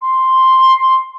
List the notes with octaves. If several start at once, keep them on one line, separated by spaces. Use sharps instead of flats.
C6